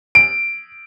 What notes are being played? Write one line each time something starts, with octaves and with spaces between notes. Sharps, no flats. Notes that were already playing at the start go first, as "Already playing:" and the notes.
D7